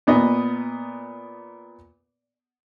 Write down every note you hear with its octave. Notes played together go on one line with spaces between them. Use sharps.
A#2 B3 D#5